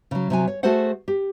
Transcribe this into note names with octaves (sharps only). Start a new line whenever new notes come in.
C#3 F#3
C3 F#3 G#5
C#5
A3 F#4 G#4 A4 C5 F#5
G4